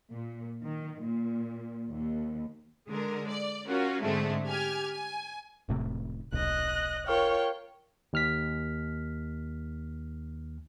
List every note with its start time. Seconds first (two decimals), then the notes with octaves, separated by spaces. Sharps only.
0.11 A#2
0.64 D#3
1.01 A#2
1.89 D#2
2.88 D3 G#3 A#4
3.29 D5
3.67 C#4 F4 F#4 A#4
4.02 G#2 D3 G#3 A3 C4 D4
4.46 G4 G#5 F6 G#6
4.90 G#5
5.69 E1 A2 C3
6.32 D#1 B1 D#5 F#6
7.07 F4 A#4 C#5 G5 C#6 F6
8.13 D#2 F6 B6